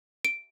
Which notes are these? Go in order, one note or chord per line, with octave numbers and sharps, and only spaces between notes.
D7